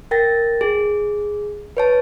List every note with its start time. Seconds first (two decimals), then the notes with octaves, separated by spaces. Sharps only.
0.11 A#4 G5 A6 A#6
0.61 G#4
1.77 B4 C#5 A5